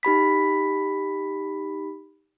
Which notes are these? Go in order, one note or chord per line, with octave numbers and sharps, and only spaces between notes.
D#4 G4 B5 B6